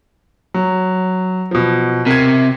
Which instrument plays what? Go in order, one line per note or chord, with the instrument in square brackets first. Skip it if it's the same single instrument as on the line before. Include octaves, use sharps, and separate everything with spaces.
[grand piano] F#3
B2 F3
[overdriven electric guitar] C3 [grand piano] A#4 G#6